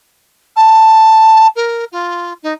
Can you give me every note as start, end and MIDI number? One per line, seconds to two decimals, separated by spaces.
0.56 1.47 81
1.55 1.84 70
1.92 2.33 65
2.42 2.53 63